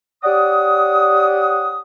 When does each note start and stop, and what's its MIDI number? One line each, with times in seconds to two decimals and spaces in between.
0.24 1.81 67
0.24 1.81 73
0.24 1.81 74
0.24 1.81 78
0.24 1.81 87